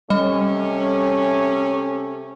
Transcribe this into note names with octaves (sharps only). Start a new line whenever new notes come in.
C3 G3 A3 C#4 D#5